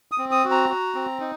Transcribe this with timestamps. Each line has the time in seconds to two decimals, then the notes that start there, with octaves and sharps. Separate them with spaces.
0.12 D#6
0.18 C4
0.31 D#6
0.45 F#4
0.51 A#5
0.69 F#4
0.95 C4
1.20 D#4